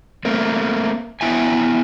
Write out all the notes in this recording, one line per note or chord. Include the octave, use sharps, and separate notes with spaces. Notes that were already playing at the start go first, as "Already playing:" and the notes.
A3 A#3 C4
B3 E4 E5 G5 G#5